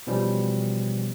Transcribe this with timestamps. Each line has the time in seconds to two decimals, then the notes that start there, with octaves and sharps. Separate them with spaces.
0.07 B2 E3 F3 G3 C#4